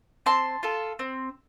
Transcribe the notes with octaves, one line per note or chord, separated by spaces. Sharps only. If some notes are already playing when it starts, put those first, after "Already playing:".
C4 A5 C6
F4 A4
C4